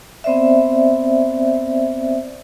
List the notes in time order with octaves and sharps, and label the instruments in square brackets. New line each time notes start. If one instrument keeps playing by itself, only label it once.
[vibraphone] B3 C4 C5 D5 E5